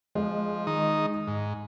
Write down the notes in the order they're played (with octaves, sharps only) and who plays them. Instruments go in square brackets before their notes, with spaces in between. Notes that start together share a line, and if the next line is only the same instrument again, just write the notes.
[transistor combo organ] F3 [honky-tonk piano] G#3
[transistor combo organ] D#3 D#4 D#6
G#2